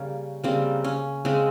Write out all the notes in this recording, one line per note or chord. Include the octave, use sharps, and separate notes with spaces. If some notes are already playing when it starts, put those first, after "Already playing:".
Already playing: C#3 G3 A#3 C#4
C#3 G3 A#3 C4
C#4
C#3 G#3 C4